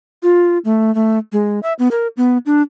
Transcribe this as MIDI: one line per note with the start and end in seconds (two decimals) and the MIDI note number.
0.23 0.58 65
0.65 0.93 57
0.95 1.18 57
1.33 1.60 56
1.63 1.73 76
1.79 1.88 59
1.91 2.07 70
2.17 2.38 59
2.46 2.62 62